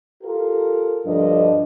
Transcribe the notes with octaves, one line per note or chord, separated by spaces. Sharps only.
F4 G4 A4 A#4
D2 G2 F3 D4 A4 D#5